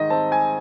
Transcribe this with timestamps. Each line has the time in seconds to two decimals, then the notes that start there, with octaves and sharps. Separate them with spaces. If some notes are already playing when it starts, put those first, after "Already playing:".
Already playing: G#2 D#3 D#5
0.10 C4 A5
0.32 G#5